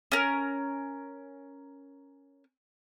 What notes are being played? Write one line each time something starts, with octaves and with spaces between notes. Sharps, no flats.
C#4 A#4